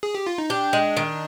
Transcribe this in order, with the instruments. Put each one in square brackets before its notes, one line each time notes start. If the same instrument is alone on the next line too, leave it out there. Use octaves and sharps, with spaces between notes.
[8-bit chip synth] G#4
G4
F4
D#4
[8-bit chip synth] D4 [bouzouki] G4
[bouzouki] G#3
D#3